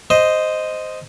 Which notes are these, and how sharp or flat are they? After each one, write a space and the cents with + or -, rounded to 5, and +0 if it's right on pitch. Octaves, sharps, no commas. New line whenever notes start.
C5 -5 D#5 +0